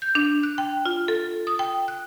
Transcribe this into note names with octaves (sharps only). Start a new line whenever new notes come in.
G6
D4
F#6
G5
F4
A4
D#6
G5
F#6